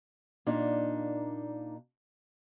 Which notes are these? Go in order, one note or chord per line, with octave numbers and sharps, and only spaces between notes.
A#2 A#3 D4 D#4